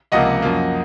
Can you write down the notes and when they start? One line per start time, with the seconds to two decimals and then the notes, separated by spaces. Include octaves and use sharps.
0.12 C#2 C3 F3 A#3 D#5 F#5
0.42 F#2 F3 A#3